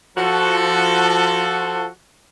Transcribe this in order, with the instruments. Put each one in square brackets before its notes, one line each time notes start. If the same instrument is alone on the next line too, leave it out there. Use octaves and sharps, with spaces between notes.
[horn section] F3 F#4 A4